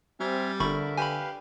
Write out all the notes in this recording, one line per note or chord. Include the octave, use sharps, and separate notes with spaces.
G3 C4 E5 G#5 F6
G1 D3 A#4 E5 B5 C#6
G4 B4 F5 G#5 B5